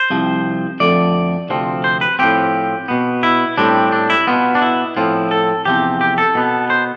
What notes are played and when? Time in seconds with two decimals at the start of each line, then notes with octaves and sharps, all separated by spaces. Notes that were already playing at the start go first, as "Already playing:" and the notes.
Already playing: C5
0.10 C2 C3 F3
0.80 F2 D3 F3 A3 D5
1.49 D2 C3 F3 C4
1.84 C5
2.01 B4
2.19 A2 F3 C4 G4
2.88 B2 B3
3.23 E4
3.58 A2 G3 C4 D4
3.92 D4
4.10 E4
4.27 B2 B3 F4
4.55 D4
4.62 E4
4.97 A2 F3 C4 F4
5.31 A4
5.65 E2 C3 F3 C4 G4
6.01 G4
6.18 A4
6.35 B2 B3
6.70 C5